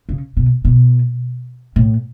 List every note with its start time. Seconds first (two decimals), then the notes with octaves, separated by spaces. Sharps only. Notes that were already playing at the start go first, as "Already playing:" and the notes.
0.09 C#3
0.37 B2
0.65 B2
1.76 A2